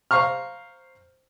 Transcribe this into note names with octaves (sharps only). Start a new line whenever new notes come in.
C5 F5 A#5 C#6 F6